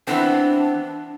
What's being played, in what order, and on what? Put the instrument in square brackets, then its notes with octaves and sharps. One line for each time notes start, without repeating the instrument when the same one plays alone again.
[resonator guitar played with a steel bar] E3 B3 C4 [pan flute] D4